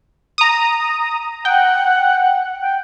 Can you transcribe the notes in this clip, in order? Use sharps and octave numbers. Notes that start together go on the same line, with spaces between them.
A#5 D#6
F#5 G5
G5